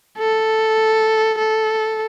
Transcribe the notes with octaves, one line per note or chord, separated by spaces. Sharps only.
A4
A4